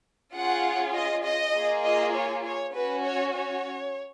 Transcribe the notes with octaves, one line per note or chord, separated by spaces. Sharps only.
C#4 F4 G#4 F#5
D#5
D#5
A#3 F4 G#4
D#5
C#5
C#5
C#4 F#4 B4
C#5
C#5